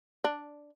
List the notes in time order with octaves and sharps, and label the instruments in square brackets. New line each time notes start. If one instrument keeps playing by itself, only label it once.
[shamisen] D4